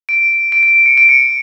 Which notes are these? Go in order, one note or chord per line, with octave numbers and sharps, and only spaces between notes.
D7
D7
D7
C#7
D7
C#7